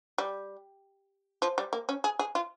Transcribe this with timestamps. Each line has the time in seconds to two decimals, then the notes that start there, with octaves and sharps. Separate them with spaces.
0.18 G3
1.42 F3
1.58 G3
1.73 A#3
1.89 C#4
2.04 G#4
2.19 G#4
2.35 F4